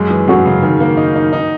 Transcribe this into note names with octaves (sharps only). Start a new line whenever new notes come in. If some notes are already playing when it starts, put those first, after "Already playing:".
Already playing: F#2 G#3
E3
F#2 F#4
C#3
D#3
A#3
D#4
D#4
D#4